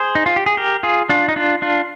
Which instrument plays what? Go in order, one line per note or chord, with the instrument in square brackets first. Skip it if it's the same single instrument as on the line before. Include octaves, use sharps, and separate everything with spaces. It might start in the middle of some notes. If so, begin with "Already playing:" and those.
Already playing: [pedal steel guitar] G#4 C5
D#4
F4
G4
G#4
G4 A#4
F4 G#4
D4 F4
D#4
D4 F4
D4 F4